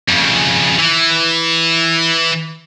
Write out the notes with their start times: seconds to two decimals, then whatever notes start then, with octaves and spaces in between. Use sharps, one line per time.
0.09 F2 C#3
0.79 E3